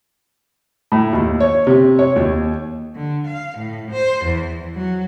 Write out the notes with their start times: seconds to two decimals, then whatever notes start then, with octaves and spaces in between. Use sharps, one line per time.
0.92 A2
1.13 D#2
1.40 C#5
1.67 C3
1.99 C#5
2.16 D#2
2.95 D3
3.27 F5
3.58 A2
3.91 C5
4.25 E2
4.75 F#3